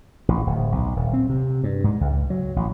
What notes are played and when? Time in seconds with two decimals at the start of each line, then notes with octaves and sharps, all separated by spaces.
0.28 A1
0.47 D1
0.72 B1
0.96 D#1
1.13 C4
1.29 C3
1.64 G2
1.84 G#2
2.01 C#2
2.30 F#3
2.56 A1